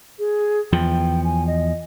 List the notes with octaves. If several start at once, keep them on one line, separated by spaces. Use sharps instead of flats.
G#4
E2 F3 G5
G#5
D#5